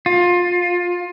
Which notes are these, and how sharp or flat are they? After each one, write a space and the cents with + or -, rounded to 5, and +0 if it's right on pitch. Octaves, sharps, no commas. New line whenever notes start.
F4 +20